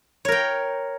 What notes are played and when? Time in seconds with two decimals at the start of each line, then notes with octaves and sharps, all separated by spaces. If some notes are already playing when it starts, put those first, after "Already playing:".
0.25 C#5
0.28 A#4
0.32 G5